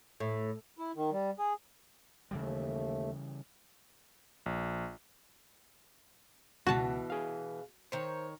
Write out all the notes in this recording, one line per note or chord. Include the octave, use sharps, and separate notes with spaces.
A2
E4
D#3
G3
G#4
D#2 C#3 E3 G3 A3
A#1
C#2 B2 E3 F#4 A5
G#4 F5
D#3 C5 C#5